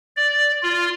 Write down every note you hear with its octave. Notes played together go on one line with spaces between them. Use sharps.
D5
F4